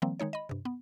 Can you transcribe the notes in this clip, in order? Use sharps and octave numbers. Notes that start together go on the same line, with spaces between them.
D#3 F3 G3 A#3 C4
D#3 G#3 D#4 C#5
D#5 B5
G2 C3
B3